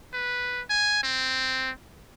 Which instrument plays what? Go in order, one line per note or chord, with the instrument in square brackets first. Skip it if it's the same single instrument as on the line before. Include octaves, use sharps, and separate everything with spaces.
[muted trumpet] B4
G#5
C4